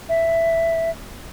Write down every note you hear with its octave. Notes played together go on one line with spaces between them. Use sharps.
E5